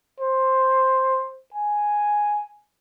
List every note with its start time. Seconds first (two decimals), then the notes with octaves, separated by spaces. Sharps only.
0.20 C5
1.54 G#5